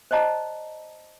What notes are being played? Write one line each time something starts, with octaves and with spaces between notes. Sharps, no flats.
C5 D5 D#5 A5 A#5